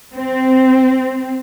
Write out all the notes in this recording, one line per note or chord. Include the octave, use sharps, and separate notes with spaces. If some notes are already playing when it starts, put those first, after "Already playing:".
C4